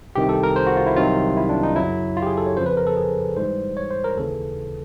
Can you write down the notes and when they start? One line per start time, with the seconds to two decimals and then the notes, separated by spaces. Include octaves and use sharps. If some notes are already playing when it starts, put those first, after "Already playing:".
0.15 C2 C3 D#3 G4
0.29 A4
0.43 A#4
0.56 C5
0.67 F#4
0.77 F4
0.87 E4
0.96 C2 C3 D#3 F#3 F4
1.37 E4
1.49 D4
1.63 D#4
1.76 F#2 C#3 F#3 E4
2.17 F4
2.22 G4
2.27 G#4
2.37 A4
2.47 C#5
2.57 F2 C#3 F3 C5
2.66 B4
2.77 A#4
2.87 A4
2.97 G#4
3.37 G#2 E3 G3 C5
3.77 C#5
3.91 C5
4.04 A#4
4.17 D#2 C#3 E3 A4